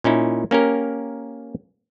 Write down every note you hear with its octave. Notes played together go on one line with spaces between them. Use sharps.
A#2 C#4 D#4 E4
A#3 C#4 G4 A#4